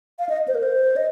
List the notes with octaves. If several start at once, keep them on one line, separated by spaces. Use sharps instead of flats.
F5
D#5
C5
A#4
C5
D#5